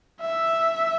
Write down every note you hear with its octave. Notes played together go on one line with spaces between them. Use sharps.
E5